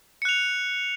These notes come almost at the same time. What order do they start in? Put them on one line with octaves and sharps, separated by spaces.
C#7 F#6 F7